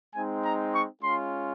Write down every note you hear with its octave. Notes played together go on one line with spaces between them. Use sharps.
G#3 C4 D#4 G#5
A#5
C#6
G#3 C#4 F4 C6